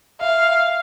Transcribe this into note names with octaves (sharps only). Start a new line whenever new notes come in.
E5 F5